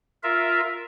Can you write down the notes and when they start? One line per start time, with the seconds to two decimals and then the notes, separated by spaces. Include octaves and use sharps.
0.23 F4 A#4 E5